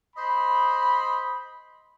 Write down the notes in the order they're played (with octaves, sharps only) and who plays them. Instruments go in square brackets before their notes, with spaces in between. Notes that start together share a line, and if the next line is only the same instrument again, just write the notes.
[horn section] C5 D#5 B5